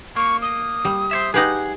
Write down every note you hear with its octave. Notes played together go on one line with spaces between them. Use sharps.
A#3 C#6
D#6
G3
C5 C#5 E5
D#4 G4 G#4 B4 F#5